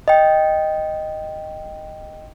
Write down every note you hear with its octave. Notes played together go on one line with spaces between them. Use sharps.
D#5 G5